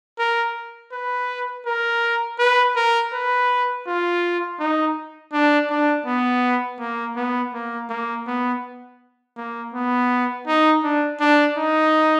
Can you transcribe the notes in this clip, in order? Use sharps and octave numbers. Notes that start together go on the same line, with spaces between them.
A#4
B4
A#4
B4
A#4
B4
F4
D#4
D4
D4
B3
A#3
B3
A#3
A#3
B3
A#3
B3
D#4
D4
D4
D#4